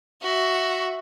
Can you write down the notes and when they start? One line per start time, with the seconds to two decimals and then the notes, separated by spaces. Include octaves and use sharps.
0.22 F#4 E5